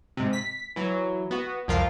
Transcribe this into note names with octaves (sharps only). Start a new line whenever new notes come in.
G#2 C3
B6
E3 F#3
B3 F#4
C2 F2 F3 F4 A#4 F5